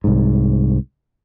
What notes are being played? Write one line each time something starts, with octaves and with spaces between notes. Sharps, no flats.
C2 G#2